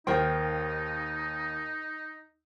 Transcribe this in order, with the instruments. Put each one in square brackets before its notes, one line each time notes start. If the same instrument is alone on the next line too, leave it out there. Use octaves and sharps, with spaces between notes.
[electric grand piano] D#2 C6 [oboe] D#4 [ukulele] A#4 C5 G5